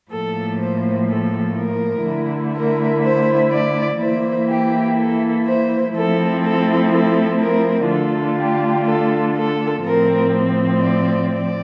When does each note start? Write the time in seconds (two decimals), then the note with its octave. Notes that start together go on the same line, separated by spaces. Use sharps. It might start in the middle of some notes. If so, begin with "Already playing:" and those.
0.10 A2 F3 A#3 A4
0.59 C5
1.08 A4
1.56 A#4
2.05 D3 A3 E4
2.54 A#4
3.03 C5
3.51 D5
4.00 E3 A#3 E4 C5
4.49 G4
4.98 A4
5.46 C5
5.94 F3 A3 C4 E4 A4
6.43 A4
6.92 A4
7.40 A#4
7.89 D3 A3 D4 F4 A4
8.38 G4
8.87 A4
9.35 A4
9.84 A2 F3 C4 A#4
10.81 D5
11.31 D5